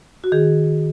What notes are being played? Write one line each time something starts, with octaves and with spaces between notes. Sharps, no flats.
F#4
D#3 G#4